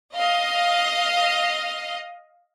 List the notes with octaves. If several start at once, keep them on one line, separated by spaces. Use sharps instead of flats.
D#5 F5